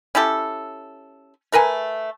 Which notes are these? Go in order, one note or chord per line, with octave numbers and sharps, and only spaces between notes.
C#4 E4 G4 A4
A3 A#4 B4 G#5